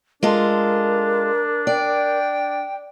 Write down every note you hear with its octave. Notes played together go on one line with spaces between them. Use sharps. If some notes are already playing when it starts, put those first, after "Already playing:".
G#3 D4 F4 A4 A#4
D5 G5